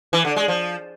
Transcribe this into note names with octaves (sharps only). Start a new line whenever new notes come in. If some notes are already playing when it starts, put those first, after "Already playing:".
E3
D3
G#3
F3